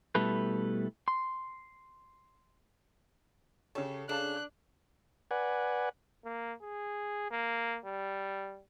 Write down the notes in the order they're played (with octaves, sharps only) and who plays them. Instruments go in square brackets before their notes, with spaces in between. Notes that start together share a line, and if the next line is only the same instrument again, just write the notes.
[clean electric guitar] B2 G3 A3 E4 A4 B4
C6
[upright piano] C#3 G4 C#5 [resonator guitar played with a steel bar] A4
[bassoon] C#3 [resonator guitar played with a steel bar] D4 [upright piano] A4 F5 A5 [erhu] F#6
[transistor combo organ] B4 D5 F#5 G#5
[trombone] A#3
G#4
A#3
G3